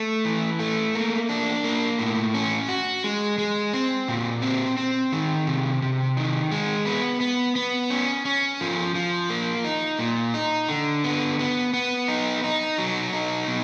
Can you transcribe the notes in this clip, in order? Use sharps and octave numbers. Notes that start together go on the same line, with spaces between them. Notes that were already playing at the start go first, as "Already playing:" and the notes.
Already playing: A3
E3
A3
A#3
D4
A#3
A2
C#4
F#4
G#3
G#3
C4
A#2
C4
C4
D#3
C3
C3
D#3
G#3
B3
B3
B3
C#4
C#4
F3
F3
A#3
D#4
A#2
D#4
D3
B3
B3
B3
D#4
D#4
F#3
D#4
B2